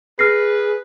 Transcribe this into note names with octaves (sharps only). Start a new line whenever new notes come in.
G#4 B4 F6 A#6 C7